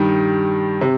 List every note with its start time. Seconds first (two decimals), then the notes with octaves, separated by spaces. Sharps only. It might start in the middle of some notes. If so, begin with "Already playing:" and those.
Already playing: G2 D#3 G3
0.81 C3